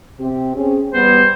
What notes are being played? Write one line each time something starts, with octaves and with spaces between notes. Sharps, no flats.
C3 C4 G4
C4 C#4 G#4
E2 G3 B3 C5